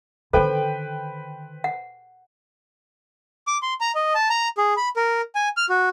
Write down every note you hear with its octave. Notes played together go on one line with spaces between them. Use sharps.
D3 D#3 A4 B4 C5 G5
F#5
D6
C6
A#5
D#5
A5
A#5
G#4
B5
A#4
G#5
F6
F#4